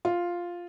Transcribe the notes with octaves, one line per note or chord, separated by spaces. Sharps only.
F4